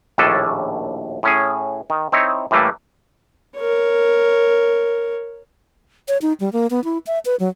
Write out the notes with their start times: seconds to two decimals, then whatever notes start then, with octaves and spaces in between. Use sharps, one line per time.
0.18 A#1 D#2 A2 C#4 D4 A4
1.23 A2 C#4 G#4
1.90 D#3
2.12 C4 D#4 E4 C#5
2.51 A2 E3 G3 A3 A#3
3.58 A#4 C#5
6.08 C#5
6.22 D#4
6.40 G3
6.53 A#3
6.70 B3
6.84 E4
7.07 E5
7.25 B4
7.40 F#3